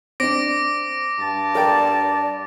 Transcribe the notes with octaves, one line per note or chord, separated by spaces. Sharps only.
C4 D4 D6 A#6 D7
G2 A5
A#4 D5 G5